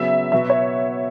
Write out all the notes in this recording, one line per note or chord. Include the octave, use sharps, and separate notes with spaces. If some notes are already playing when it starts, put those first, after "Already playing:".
Already playing: C#3 F#3 B3 E5
B2 F#3 B3 F#4 E5
C#5